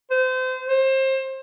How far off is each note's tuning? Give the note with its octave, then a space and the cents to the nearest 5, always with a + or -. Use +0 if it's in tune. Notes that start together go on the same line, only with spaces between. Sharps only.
C5 -30
C5 +25